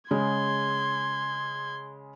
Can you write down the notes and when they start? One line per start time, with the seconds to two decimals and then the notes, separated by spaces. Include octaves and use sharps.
0.11 C#3 G#3 C6 G#6